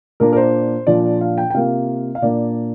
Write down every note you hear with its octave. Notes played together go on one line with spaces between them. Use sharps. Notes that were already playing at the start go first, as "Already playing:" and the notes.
A#2 A#3 D4 A#4
A#4
C5
A#2 F3 D4 F4 D5
F5
G5
G5
C3 A#3 F4 F5
F5
A#2 A#3 D4 D5